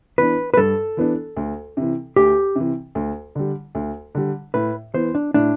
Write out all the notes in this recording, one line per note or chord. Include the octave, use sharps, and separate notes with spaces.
E3 B3 D4 B4
B4
G2 A4
E3 B3 D4
D2
C3 E3
D2 G4
C3 E3
D2
D3 G3
D2
D3 G3
A2 B4
E3 B3 C5
D4
A2 D4